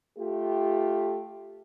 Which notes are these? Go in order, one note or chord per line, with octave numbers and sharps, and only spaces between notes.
A3 F4 G4